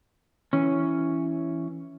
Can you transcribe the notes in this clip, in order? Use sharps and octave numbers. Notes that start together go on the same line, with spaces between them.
E3 C#4